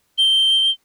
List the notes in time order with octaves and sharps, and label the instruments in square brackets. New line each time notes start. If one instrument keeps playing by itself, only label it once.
[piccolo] G7